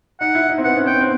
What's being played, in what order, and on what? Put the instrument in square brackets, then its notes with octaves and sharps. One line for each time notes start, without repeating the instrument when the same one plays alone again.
[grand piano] D#4 [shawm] F#5
[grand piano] E4
D#4
C4
[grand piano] B3 [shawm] F#5
[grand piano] C#4
[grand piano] C4 [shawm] G5
[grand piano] C4